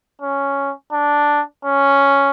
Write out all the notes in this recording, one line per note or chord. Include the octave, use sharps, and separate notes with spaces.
C#4
D4
C#4